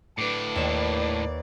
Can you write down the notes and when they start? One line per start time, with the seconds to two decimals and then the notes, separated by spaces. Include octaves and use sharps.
0.18 A2 D4 B4 D6
0.56 D#2 D5 E7